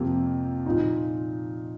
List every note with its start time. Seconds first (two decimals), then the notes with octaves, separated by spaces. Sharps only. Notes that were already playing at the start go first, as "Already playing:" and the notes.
Already playing: F2 C3 F3 A#3 G4
0.66 A#2 F3 D#4